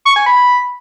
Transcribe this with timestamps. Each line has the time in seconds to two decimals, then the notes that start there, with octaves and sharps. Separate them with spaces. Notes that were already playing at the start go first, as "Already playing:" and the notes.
0.06 C#6
0.16 G#5
0.26 B5